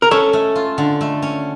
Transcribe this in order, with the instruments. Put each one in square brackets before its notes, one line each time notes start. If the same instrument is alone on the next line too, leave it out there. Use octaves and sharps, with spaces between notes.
[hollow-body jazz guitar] A#4
[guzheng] C#4 [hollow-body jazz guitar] A4 C#5
[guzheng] A3
F4
D3
A3
C#4